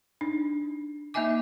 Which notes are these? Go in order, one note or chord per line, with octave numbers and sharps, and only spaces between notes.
D4 D#4
A#3 D#4 D#5 E5 G#5 D6